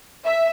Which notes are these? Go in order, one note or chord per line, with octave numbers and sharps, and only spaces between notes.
E5